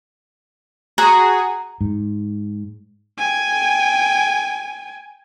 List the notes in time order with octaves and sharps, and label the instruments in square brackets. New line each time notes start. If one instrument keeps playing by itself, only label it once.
[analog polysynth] F#4 G#4 [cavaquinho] A#5
[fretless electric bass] G#2
[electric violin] G5 G#5